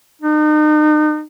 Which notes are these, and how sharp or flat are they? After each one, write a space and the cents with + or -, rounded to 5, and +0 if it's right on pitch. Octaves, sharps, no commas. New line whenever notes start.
D#4 -40